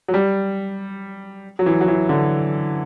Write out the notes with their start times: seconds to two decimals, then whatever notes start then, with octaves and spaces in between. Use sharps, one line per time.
0.08 F#3
0.14 G3
1.59 F#3
1.66 E3
1.81 F#3
1.88 E3
2.09 D3